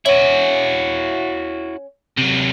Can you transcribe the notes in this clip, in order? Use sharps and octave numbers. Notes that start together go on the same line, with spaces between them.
C#4 E4 F#4
C3 F#3